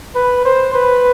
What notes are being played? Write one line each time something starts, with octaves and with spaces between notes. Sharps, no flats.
B4
C5
B4